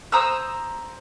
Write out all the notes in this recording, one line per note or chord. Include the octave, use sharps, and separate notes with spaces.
C5 A#5 D#6 E6